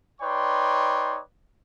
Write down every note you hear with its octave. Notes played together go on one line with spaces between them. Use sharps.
D#4 B4 C#5 D5 G5 C6